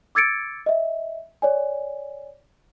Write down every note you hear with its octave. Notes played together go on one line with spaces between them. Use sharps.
D6 E6 G#6 A6 C#7 D7
D#5 E5
C#5 D5 G#5